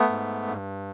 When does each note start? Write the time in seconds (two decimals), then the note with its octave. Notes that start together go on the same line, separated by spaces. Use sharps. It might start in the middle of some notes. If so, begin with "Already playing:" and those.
Already playing: A3 B3
0.09 G#2
0.47 G2